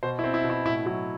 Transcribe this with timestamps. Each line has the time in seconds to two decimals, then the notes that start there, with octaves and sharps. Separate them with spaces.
0.03 B2 C5
0.19 E4
0.24 C4
0.34 E4
0.44 B2
0.50 E4
0.65 A2 E4
0.86 F#3 E4